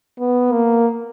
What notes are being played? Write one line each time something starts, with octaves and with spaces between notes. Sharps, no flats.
B3
A#3